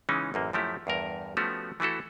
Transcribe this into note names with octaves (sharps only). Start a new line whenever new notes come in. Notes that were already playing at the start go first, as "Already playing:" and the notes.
C#3 E3 G#3 C#4 D#4
A1 F#2 A#3
F#2 F3 A3 E4 G4
E2 G2 A#4
F3 A3 B3 C#4 F#4 G4
E3 A3 E4 F#4 A4